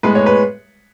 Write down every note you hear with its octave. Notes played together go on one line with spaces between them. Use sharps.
A2 G#3 B3 B4
C#5
B4